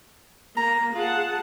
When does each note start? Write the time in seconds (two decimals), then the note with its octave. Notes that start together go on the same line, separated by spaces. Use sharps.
0.57 A#3 A#5
0.95 F4 G#4 F#5 A5